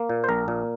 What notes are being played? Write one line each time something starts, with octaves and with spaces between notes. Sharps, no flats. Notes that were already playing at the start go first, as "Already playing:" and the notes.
Already playing: A#3
A#2
C5
A#1 A#4
A#2